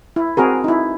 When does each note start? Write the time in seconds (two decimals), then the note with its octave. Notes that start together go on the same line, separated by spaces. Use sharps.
0.16 E4
0.37 C4 F#4 G#4 A#4
0.64 D#4 E4